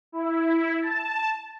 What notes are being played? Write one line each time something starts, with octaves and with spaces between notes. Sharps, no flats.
E4
A5